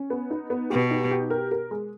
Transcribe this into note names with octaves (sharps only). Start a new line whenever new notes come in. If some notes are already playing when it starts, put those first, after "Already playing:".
Already playing: C#4
B3
D#4
B3
B2 G4
D#4
G4
A#4
A#4
G#3